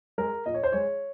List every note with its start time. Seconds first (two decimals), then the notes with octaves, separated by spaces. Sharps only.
0.18 G#3 A#4
0.46 A#2 D#5
0.54 C#5
0.63 C5
0.72 G#3 C#5